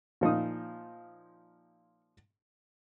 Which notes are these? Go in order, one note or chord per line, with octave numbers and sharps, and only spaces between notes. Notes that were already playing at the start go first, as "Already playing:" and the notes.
A#2 F3 D#4 D#6